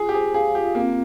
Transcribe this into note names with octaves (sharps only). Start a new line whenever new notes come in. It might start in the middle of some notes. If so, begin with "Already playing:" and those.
Already playing: F4 G#4
G4
G#4 C5
G#4 F5
F4 G4
A#3 C4